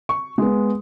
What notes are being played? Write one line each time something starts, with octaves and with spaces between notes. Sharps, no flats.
C#6
G#3 B3